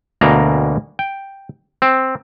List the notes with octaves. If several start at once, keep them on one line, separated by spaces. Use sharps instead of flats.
D2 B2 A#3 A#5
G5
C4